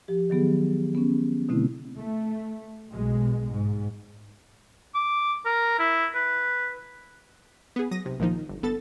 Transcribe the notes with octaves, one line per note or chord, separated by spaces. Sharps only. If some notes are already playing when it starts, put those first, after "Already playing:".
F3 G4
D#3 F#3 B3 G#4
B3 C#4
B2 D3 A3 C4 E4
A3
B1 B2 G#3
G#2
D6
A#4
E4
B4
B3 G#4
F#3 D#6 A#6
B1 C3
A#1 A#2 D#3 F3 D#4
G1
G1 B3 A4 A6